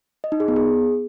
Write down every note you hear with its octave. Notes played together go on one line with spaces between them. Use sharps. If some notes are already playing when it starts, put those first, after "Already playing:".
D#5
D#4
G#4
B3
G#4